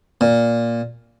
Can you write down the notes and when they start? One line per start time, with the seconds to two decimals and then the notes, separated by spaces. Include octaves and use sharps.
0.21 A#2